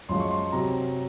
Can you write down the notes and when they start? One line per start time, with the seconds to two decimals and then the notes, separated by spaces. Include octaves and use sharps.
0.09 F#2 F3 G#3 C6
0.20 C#6
0.31 C6
0.52 C3 F#3 A#5